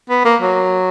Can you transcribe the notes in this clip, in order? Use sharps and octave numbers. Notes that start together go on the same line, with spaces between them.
B3
A#3
F#3